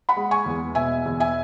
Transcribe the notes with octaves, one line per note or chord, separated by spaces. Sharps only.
F#5 B5
G#3
G#5 C#6
E2
B2 E5 G#5
E2
E5 G#5